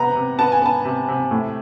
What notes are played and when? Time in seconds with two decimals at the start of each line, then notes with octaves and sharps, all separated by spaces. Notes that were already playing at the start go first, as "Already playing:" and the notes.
Already playing: C3 B3 A#5
0.15 C3
0.39 B3 A5
0.52 G#5
0.62 B3 A5
0.85 C3
1.08 C3
1.31 A2